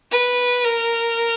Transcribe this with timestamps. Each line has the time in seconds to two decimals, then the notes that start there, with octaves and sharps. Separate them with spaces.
0.11 B4
0.64 A#4